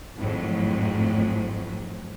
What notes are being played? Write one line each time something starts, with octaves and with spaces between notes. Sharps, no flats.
G#1 F2 A2 F#3